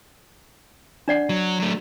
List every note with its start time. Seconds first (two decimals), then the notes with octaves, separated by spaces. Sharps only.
1.08 D4 D5 F#5
1.29 F#3
1.60 F#3 A3